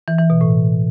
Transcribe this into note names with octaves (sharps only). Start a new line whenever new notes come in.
E3
E3
B2
A2